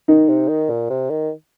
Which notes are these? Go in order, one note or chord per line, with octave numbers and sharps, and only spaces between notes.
D#3 D#4
C3
D#3
A#2
C3
D#3